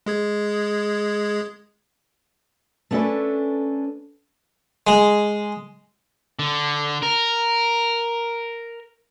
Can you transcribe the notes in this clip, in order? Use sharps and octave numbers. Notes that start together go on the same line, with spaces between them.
G#3 G#4 G#6
A3 B3 C#4 D4 A4 B4
G#3
D3
A#4